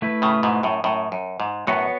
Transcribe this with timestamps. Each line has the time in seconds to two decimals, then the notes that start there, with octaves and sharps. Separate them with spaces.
0.02 A3 E4 B4
0.22 A2 C#3
0.43 G#2 B2
0.63 F#2 A2
0.84 F#2 A2
1.12 F#2
1.40 G#2
1.67 F#2 A2 B3 F#4 C#5